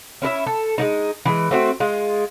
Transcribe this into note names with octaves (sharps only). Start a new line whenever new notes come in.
C#4 E4 A#4 E5
A4
G#3 A#3 D#4
E3 G#3
A3 C4 F#4
G#3 F4